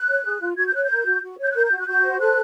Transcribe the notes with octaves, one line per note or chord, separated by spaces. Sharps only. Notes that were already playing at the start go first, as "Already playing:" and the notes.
Already playing: F#6
C#5
G#4
F4
F#4 G#6
G6
C#5 F#6
A#4 G6
F#4
F#4
C#5
G6
F#6
A#4 G6
G6
F#4
F#6
F#4 G6
C5
A4 F#6